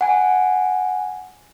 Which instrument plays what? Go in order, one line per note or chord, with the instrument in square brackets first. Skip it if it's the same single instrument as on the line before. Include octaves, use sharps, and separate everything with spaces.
[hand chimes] F#5 G#5